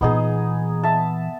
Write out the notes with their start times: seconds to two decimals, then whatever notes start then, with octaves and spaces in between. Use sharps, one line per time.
0.01 A#2 E3 B3 D#4 G#4
0.83 E5 A5